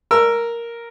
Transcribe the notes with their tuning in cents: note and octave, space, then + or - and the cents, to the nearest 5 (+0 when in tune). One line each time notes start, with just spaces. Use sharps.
A#4 +0 E6 +20